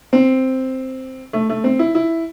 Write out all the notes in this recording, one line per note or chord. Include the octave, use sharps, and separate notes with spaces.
C4
A3
A3
C4
E4
E4